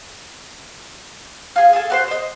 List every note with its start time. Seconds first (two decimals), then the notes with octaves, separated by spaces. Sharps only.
1.56 F4 G#4
1.73 G#4 A4
1.90 F#4 B4 C5
2.08 C5 D#5